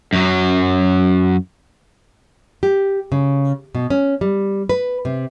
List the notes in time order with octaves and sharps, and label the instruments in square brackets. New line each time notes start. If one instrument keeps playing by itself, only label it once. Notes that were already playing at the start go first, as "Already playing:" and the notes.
[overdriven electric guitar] F#2 F#3
[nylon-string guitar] G4
C#3
B2
C#4
G3
B4
C3